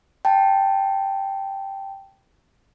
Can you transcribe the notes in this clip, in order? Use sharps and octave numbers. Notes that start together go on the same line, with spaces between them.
G5 A5